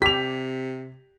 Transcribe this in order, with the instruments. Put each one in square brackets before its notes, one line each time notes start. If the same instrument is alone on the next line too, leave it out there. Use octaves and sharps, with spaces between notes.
[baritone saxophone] C3 [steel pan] G4 [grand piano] B6 F7